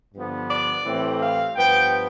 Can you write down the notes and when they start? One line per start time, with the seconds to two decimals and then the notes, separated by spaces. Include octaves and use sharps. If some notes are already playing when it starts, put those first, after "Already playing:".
0.14 G2 D3 F3 B3
0.49 D5
0.84 A2 E3 G3 C4
1.21 F5
1.56 G2 F3 B3 G5